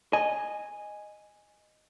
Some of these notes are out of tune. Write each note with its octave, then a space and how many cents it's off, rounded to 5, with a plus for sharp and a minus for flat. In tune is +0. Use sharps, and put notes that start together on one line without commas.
D#5 -10 G#5 +0